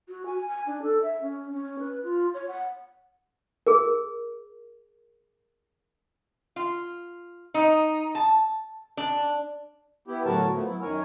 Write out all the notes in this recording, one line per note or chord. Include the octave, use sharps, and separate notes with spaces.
F#4
G#5
G#5
D4
A4
E5
C#4
C#4
B4
F4
C#5
F#5
G#4 A#4
F4
D#4
A5
D4
B3 E4 G4
A2 D3 F#3 F#4 A#4 A5
F3 A3 B3
F#3 E4
F#2 D#3 A#4 C#5 G#5